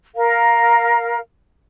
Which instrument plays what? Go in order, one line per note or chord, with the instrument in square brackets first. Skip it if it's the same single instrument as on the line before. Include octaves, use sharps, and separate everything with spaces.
[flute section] A#4 F5